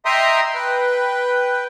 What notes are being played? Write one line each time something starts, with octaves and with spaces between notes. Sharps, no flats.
D#5 E5 G5 A#5 C6 D#6
B4 G5